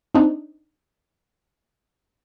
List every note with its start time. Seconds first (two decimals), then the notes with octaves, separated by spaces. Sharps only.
0.15 C4 D4 D#4